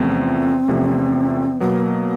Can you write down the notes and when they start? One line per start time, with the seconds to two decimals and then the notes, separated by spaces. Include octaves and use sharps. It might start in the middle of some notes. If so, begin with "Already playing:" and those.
Already playing: E2 C3 F3 A3 C4 C#4
0.68 E2 C3 F3 A3 C#4
1.60 B2 F#3 A#3 B3